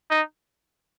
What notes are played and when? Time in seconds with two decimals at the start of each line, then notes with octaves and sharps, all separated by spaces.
0.10 D#4